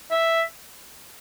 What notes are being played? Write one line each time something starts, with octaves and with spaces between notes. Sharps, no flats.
E5